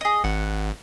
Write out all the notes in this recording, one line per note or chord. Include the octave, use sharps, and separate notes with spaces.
G#4 D#5
G#1 F#5